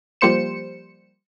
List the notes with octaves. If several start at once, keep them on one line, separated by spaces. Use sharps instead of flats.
F3 G3 A#3 C5 C#7 E7